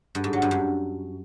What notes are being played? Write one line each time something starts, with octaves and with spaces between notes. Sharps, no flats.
G2
G#2
F#3
G2
F#2